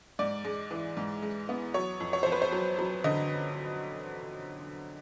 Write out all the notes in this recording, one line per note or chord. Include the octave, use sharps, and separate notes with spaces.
G#2 D5
G#3
E3
G#2
G#3
B3
F#3 C#5
F2
C#5
F2 C5
B4
C5
F#3
F#3
D3 D#5